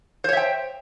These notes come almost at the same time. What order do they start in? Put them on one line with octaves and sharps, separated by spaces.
C5 C#5 E5 G5